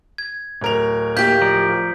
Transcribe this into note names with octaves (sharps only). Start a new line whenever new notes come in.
G#6
D1 A#4 F7
A#3 E4 G4 G6 B6
F3 D5 A#5